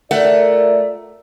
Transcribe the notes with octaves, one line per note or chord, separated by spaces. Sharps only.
A3 F4 A#4 D5 F#5